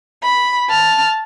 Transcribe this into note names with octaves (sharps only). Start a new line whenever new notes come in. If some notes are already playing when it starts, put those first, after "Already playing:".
B5
A5 F6